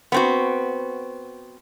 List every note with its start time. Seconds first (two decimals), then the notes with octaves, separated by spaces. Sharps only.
0.12 B3 C4 F#4